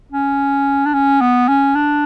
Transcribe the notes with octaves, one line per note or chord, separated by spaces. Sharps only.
C#4
D4
C#4
B3
C#4
D4